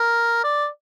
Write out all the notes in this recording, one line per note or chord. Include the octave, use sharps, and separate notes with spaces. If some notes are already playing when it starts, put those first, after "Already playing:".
Already playing: A#4
D5